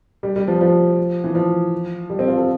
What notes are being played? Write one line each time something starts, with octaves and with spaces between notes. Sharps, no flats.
G3
G3
F3
F3
E3
F3
G3
C4
F4
A4